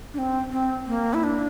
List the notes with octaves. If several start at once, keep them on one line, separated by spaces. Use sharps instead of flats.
D4
C4
C4
A#3
E4
D4